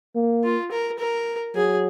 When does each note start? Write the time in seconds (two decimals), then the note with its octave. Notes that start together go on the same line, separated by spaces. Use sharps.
0.15 A#3
0.44 F4
0.71 A#4
0.99 A#4
1.55 F#3 G#4